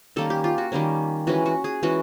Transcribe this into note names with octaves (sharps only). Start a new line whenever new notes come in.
D#3 G3 A#3 C#4 A4
G4
F4
F#4
D#3 G3 A#3 C#4
E3 G#3 C#4 F#4
F#4
G#4
E3 G#3 C#4 F#4